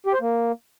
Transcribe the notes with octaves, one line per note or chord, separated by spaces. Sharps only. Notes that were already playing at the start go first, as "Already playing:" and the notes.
G4
C5
A#3